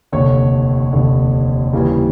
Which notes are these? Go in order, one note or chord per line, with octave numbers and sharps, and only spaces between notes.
F1 D#2 D3 C#5
F1 D#2 D3
D#2 C#3 E3 G3